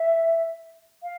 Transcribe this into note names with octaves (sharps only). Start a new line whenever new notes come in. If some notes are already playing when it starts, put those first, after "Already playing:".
Already playing: E5
F5